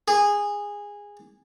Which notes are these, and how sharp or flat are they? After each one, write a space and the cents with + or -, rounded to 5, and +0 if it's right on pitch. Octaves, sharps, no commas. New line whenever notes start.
G#4 -15